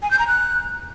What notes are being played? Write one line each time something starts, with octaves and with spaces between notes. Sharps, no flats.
G#5
G6
A#5
F#6